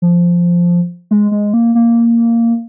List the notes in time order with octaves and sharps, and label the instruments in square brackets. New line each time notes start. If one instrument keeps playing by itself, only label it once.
[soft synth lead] F3
G#3
G#3
A#3
A#3